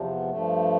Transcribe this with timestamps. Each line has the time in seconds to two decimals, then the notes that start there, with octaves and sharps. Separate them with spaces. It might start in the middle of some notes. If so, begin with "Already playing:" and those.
Already playing: E2 C3 F3
0.08 B3
0.29 G2 F3 A3